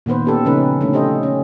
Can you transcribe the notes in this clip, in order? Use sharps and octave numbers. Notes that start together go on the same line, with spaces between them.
A#2 D#3 B3 B4 C5
C#4 G4 A4
C#3 F3 C#4 D#4 B4
D3 A3 C#4
G4 A4 C5 D#5
C#4